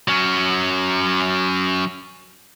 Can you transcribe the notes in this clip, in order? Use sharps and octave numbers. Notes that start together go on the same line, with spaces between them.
F#3 C#4